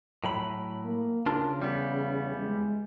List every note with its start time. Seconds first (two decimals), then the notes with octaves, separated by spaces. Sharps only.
0.24 A2 F#3 B5
0.84 A#3
1.26 C#3 D4 F4 A#4
1.60 E2 G3 B3
2.36 G#3